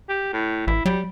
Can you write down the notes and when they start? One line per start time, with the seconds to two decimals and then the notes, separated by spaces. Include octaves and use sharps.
0.09 G4
0.33 A2
0.67 A1 E4
0.85 F#3 G3